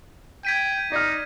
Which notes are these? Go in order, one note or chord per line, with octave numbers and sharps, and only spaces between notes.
G5 G#6 B6 D#7
D#4 D5 F6